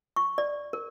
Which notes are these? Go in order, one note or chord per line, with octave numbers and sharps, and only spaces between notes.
C#6
D5
A#4